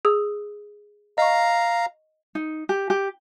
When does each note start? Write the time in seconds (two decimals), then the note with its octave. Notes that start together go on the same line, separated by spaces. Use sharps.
0.05 G#4 D#6 E6
1.18 D#5 F5 A#5 C#6
2.35 D#4
2.69 G4
2.90 G4